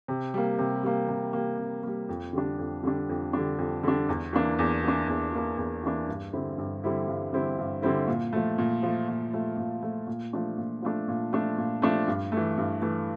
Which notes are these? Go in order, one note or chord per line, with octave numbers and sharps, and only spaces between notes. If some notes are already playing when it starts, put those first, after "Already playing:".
C3
G3 A#3
C3
G3 A#3
C3
G3 A#3
C3
G3 A#3
F2
D3 G3 D4
F2
D3 G3 D4
F2
D3 G3 D4
F2
D3 G3 D4
E2
E3 A#3 D4
E2
E3 A#3 D4
E2
E3 A#3 D4
E2
E3 A#3 D4
G2
D3 G3 C4 E4
G2
D3 G3 C4 E4
G2
D3 G3 C4 E4
G2
D3 G3 C4 E4
A#2
F3 A3
A#2
F3 A3
A#2
F3 A3
A#2
F3 A3
A#2
F3 A3 D4
A#2
F3 A3 D4
A#2
F3 A3 D4
A#2
F3 A3 D4
G2
A3
E3
G2
E3 A3